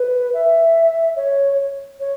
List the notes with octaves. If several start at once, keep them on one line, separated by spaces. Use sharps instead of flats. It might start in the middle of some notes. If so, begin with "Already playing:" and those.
Already playing: B4
E5
C#5
C#5